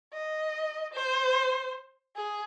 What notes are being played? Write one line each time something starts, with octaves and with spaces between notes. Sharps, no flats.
D#5
C5
G#4